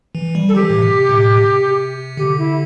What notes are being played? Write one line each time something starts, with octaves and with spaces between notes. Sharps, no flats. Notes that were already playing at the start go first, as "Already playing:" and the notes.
E3
G3
A4
E3 G4
A2
C3
A2
C3
D3 G4
E4